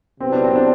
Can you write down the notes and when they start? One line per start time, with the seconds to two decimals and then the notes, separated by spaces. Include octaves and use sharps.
0.20 C3 F#3 B3 C4 E4
0.32 D4
0.44 C4
0.56 D4